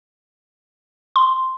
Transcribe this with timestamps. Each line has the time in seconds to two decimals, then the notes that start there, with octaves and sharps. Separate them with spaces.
1.16 C6